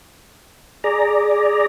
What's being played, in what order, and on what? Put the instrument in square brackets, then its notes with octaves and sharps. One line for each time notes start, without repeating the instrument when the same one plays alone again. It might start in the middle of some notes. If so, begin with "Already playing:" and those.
[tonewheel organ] G#4 D5 A#5